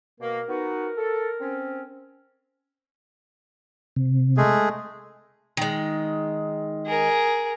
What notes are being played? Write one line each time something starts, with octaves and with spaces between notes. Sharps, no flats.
B2 A#3 A#4
B3 D#4 F#4
A4
C4 C#4
C3
G#3 A3 G#4
D#3 G#3
G#4 A#4